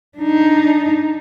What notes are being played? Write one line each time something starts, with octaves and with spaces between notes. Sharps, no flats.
D4 D#4